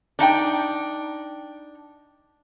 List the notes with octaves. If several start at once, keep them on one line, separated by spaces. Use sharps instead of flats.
D4 D#4 F5 G5